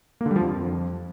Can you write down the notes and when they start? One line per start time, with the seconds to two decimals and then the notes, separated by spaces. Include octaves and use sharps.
0.21 A#3
0.26 D3
0.31 G3
0.36 F3
0.41 F2